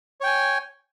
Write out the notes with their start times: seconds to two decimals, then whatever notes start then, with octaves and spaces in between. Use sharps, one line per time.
0.21 C#5
0.23 G5
0.26 G#5